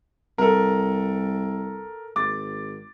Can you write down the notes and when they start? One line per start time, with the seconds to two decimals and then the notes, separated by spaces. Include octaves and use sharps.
0.38 C2 A4 A#4
2.16 G#1 D6 A6